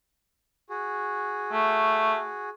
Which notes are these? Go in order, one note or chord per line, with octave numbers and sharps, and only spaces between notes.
F#4 G#4
A3